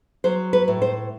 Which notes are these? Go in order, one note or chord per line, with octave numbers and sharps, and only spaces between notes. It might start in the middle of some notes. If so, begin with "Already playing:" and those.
F#3 C5
B4
A2
C5